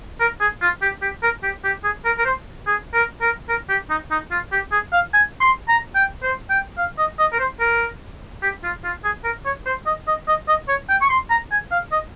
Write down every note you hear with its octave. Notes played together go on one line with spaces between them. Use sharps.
A#4
G#4
F4
G4
G4
A#4
G4
G4
G#4
A#4
A#4
C5
G#4
A#4
A#4
A#4
G4
D#4
D#4
F4
G4
G#4
F5
G#5
C6
A#5
G5
C5
G5
F5
D#5
D#5
A#4
C5
A#4
G4
F4
F4
G#4
A#4
C#5
C5
D#5
D#5
D#5
D#5
C#5
G5
C#6
C6
A#5
G#5
F5
D#5